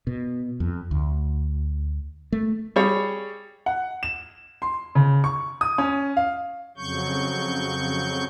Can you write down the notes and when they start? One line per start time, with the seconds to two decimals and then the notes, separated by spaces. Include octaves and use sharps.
0.07 B2
0.60 F2
0.91 D2
2.32 A3
2.76 G3 G#4 C#5
3.66 F#5
4.03 E7
4.62 C6
4.95 C#3
5.24 C#6
5.61 D#6
5.78 C#4
6.17 F5
6.77 F2 C#3 F#3 C#6 G6